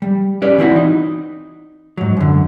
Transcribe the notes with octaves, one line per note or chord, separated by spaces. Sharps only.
G3
C#4 G4 B4 D5
E3 C4 E4 F#4
D#4
G#2 F#3
F#2 D3